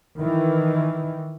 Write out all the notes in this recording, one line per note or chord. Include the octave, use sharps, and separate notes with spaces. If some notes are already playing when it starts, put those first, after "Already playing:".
D#3 E3